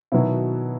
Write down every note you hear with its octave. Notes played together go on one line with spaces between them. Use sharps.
B2 D#3 F#3 B3 E4